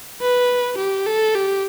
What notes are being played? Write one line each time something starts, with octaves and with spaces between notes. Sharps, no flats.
B4
G4
A4
G4